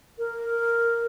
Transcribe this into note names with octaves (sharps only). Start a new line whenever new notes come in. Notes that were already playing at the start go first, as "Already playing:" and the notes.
A#4